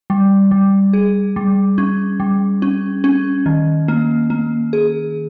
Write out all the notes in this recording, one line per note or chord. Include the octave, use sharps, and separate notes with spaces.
G3
G3
G#4
G3
C#4
G3
C#4
C#4
D#3
A#3
A#3
G#4